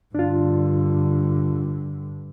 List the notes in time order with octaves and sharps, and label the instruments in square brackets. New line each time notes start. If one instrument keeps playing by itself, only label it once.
[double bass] G2 D3 [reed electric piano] D4 F4